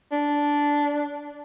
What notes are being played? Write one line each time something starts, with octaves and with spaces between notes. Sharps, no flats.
D4